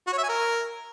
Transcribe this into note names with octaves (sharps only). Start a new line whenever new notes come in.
F#4
C#5
E5
G#5
A#4